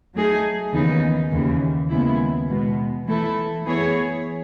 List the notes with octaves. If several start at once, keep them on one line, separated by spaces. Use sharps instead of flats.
F#3 A3 D#4 G#4
D#2 C#3 E3 B3 D#4
D#2 C#3 E3
D#2 C#3 G#3 B3 E4
B2 G#3 B3
E3 A3 E4 A4
E3 B3 E4 G#4 C#5